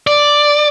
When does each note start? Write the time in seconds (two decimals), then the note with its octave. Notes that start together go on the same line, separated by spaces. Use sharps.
0.07 D5